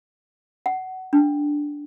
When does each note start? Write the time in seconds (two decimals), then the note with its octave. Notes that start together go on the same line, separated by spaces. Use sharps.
0.66 F#5
1.13 D4